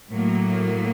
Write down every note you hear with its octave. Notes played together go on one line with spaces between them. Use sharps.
A2 F#3 A#3